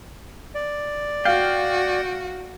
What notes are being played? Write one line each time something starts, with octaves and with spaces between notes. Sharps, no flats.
D5
F#4 F5 G5